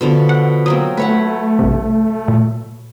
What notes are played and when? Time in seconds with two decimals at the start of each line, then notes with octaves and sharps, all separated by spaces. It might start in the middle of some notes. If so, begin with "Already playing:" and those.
0.01 B2 D3 F3
0.29 F#5
0.66 F#3 A#3 C4 D#6
0.97 A3 B4 C#5 F#5
1.59 A#1 G2 C3
2.28 A#2